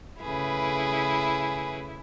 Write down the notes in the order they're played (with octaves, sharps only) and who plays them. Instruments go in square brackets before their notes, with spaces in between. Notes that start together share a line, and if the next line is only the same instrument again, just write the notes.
[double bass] C#3 A3 [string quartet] E4 [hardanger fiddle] G#4 B4